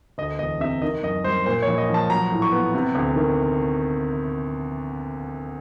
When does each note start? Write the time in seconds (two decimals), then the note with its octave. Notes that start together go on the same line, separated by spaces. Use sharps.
0.18 D2 D#5
0.39 E1 D#5
0.60 C3 E5
0.82 D#3 D#5
1.03 F#2 D#5
1.24 G3 C5
1.46 A#2 C5
1.62 C#5
1.67 A#1
1.78 D#5
1.89 F3 A5
2.10 F#3 A#5
2.32 A2
2.42 C#6
2.52 B3
2.75 C3
2.95 D2
3.16 D#3